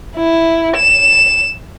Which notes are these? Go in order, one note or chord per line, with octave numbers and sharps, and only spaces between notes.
E4
E7